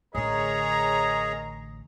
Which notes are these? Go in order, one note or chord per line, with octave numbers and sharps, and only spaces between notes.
A1 D3 G#4 A#4 C#5 D#5 A#5